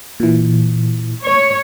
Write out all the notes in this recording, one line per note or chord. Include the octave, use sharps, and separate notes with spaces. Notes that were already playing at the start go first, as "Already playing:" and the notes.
A#2 E3
C#5